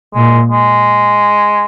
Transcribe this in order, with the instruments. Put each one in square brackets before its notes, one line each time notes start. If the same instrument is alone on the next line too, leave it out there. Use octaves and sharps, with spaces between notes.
[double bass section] A#2 [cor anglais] G#3
[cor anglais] G#3